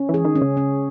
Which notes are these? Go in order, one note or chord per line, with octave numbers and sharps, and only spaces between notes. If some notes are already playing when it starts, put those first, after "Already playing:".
Already playing: C#4
E3 G#4
D#3
C#4
C#3
C#4